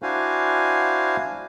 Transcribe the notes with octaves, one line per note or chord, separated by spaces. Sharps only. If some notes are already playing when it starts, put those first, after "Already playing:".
D4 E4 F#4 C5 F5 G#5